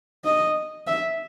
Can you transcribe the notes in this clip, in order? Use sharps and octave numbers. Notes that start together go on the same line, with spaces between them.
D#5
E5